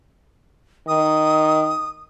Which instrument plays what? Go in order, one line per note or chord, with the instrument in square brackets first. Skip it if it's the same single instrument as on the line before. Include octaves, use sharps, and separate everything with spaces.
[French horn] D#3 [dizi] D#6